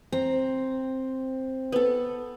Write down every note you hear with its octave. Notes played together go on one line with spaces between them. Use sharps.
C4 A#5
B3 A4